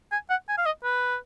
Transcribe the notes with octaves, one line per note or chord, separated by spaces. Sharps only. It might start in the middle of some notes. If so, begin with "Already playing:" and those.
G#5
F#5
G#5
F5
D#5
B4